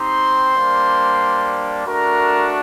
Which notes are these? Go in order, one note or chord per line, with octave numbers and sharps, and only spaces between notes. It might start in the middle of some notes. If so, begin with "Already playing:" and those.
Already playing: C4 D#4 G4 C5 C6
G3 A#3 D4
A3 D4 F#4 A#4 A#5